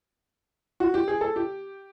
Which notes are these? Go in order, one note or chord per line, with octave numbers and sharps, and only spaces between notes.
F#4
G4
G#4
A4
G4